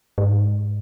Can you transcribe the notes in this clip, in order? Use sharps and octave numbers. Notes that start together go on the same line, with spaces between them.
G#2